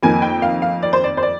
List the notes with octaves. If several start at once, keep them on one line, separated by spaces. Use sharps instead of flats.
F2 D#3 A#3 G#5
G5
F5
F5
D5
C5
D5
C5
D5